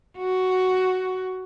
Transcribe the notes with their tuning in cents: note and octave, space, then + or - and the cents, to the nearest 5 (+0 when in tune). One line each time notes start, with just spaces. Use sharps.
F#4 +5